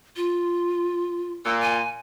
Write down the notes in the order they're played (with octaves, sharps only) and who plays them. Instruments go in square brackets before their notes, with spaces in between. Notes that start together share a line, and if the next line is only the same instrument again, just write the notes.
[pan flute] F4
[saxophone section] A#2 [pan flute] E6
[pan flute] G#5